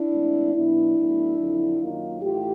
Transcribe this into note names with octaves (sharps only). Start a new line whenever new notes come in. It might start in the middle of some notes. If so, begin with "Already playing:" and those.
Already playing: D4 E4
A2 E3 G#3 C4
B2 F#3 B3 D4 E4
A2 F#3 B3
F2 D3 F#3
F#2 D#3 F#3 A#3 D#4 F4
A2 E3 F4 G4